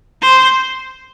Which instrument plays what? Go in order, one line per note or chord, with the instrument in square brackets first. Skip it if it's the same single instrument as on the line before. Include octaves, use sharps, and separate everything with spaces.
[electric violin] C5